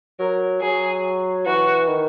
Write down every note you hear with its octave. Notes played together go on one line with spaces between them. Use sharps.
F#3 A#4
F#3 G#4
E3 F#4
D#3